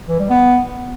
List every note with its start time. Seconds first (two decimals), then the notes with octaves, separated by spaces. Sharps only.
0.09 E3
0.19 G3
0.30 B3